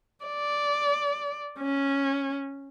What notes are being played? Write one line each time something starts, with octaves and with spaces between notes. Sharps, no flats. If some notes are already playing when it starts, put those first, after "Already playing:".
D5
C#4